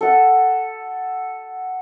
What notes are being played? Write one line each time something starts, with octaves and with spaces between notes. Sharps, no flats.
A4 F#5